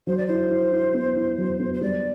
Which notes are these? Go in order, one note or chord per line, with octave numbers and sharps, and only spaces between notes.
F#3 C5
D5
E4 C5
E4
E4
B3
E4
F#3
B3
C5
G3 D5